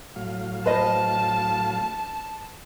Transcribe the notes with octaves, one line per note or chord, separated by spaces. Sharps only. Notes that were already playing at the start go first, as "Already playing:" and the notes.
A2 F#3 F5
B4 C5 D#5 A5